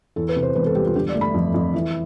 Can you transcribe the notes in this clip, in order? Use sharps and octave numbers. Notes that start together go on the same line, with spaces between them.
E2 A4
B4
C3
C5
E1 B4
A4
G3 G4
F4
D3 G4
D5
A3
B5
F2
F2
E3